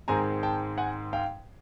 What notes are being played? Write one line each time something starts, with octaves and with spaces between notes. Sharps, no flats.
G#2 D#3 G#3 C4 G#5 A#5
G5 A5
F#5 G#5
F5 G5